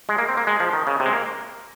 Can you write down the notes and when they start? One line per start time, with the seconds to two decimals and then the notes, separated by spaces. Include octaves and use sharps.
0.09 G#3
0.18 A#3
0.29 C4
0.37 A#3
0.47 G#3
0.60 F3
0.73 D#3
0.87 C#3
1.00 C3
1.06 G#3
1.13 A#3